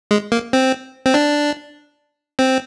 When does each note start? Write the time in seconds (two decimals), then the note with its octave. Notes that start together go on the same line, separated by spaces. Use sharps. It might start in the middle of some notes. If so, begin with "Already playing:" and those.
0.11 G#3
0.32 A#3
0.53 C4
1.06 C4
1.14 D4
2.39 C4